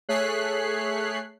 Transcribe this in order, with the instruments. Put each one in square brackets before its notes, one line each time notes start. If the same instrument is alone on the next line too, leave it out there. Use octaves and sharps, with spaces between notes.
[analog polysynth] A3 G#4 C#5 F#6 B6 C7